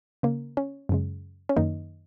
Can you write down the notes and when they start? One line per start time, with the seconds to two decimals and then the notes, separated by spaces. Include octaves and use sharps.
0.23 C#3 A#3
0.57 C#4
0.89 F#2 C#3 G#3
1.49 C#4
1.57 F#2 D#3 A#3 D#4